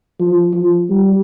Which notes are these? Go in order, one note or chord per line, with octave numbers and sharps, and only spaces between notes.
F3
F3
G3